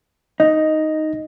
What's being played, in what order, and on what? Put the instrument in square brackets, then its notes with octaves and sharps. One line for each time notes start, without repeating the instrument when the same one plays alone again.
[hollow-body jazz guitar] D#4 [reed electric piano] D#5